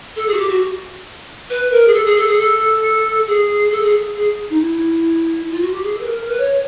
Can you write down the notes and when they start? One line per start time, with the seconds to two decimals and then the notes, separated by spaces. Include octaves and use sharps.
0.16 A4
0.27 G#4
0.34 F#4
0.38 G4
0.49 F#4
1.50 B4
1.71 A#4
1.87 G#4
1.93 A4
2.05 G#4
2.16 A4
2.27 G#4
2.38 A4
3.27 G#4
3.71 A4
3.83 G#4
4.17 G#4
4.50 D#4
4.61 E4
5.50 F4
5.61 F#4
5.72 G4
5.83 G#4
5.94 A4
6.00 B4
6.05 A#4
6.17 A#4
6.28 B4
6.39 C#5